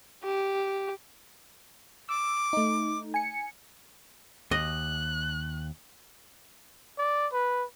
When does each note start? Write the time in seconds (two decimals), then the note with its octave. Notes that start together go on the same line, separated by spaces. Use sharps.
0.23 G4
2.09 D6 E6
2.53 A3 D#4
3.14 G#5 C#7
4.51 D#2 D#5 F#6
6.98 D5
7.33 B4